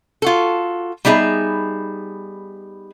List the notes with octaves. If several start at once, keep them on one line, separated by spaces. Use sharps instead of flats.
F4 F#4 A4
G3 B3 D#4 G#4 E5